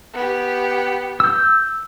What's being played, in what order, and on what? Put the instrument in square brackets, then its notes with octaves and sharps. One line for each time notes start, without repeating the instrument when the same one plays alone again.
[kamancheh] B3 G4
[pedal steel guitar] E6 G6